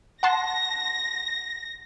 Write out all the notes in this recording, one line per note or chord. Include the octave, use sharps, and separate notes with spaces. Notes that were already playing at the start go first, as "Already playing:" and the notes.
F#5 A5 C6 A#6